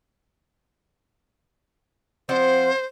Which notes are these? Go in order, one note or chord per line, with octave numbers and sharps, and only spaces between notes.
F3 C4 C5 F#5